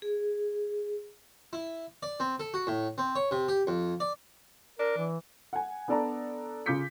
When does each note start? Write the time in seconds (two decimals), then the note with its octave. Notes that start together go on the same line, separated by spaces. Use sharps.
0.02 G#4
1.53 E4
2.03 D5
2.20 C4
2.40 A4
2.54 F#4
2.67 A2
2.98 C4
3.16 C#5
3.31 C3
3.48 G4
3.67 F2
4.00 D5
4.79 D4 A#4
4.97 E3
5.53 F#5 G#5
5.88 B3 D4 A4 D5 A5 A#5
6.66 C#3 F4 D6 G6 B6 C#7